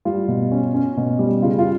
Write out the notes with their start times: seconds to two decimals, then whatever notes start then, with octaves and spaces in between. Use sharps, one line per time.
0.05 G3 F4
0.28 B2
0.52 C#4
0.74 C#4
0.97 B2
1.19 G3
1.42 C#3 F4
1.59 F4